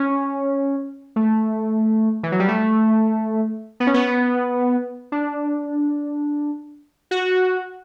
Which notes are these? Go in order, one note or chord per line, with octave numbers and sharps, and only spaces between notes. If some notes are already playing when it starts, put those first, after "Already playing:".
Already playing: C#4
A3
E3
F#3
G3
A3
B3
C#4
B3
D4
F#4